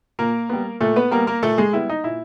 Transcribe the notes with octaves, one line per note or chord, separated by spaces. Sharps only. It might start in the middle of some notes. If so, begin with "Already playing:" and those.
A#2 A#3 A#4
G3 B3
A#2 A3 A4
B3 B4
G3 A#3 B3 A#4
A#3 A#4
A#2 A3 A4
G#3 G#4
G3 B3 E4
D#4
A#2 E4